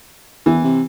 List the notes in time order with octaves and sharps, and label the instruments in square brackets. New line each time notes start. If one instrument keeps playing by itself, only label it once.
[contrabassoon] E2 [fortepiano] E3
[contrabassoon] C3